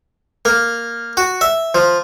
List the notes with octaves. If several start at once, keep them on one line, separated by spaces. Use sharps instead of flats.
A#3
F#4
E5
F3